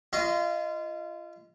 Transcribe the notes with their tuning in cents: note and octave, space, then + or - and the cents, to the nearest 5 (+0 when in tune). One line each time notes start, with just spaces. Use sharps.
F4 -30 D#5 +0